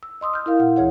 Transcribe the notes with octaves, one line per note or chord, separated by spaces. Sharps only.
E6
D#5 C6 D#6 E6
F6 G6
E4 A#4 F5
A#2 F#5
D2 E3 G#4 C#5 F#5